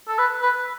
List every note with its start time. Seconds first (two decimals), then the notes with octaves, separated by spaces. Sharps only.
0.08 A4
0.19 B4
0.42 B4